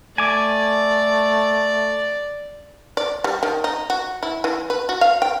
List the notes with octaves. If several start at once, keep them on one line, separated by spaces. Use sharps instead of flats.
A3 D5 G#5 D6
D5
G3
D#3
D#4
F#4
E4
E3
B4
F#4
F5
G5